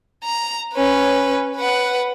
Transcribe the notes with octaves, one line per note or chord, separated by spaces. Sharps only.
A#5
C#4 B4
B4 F#5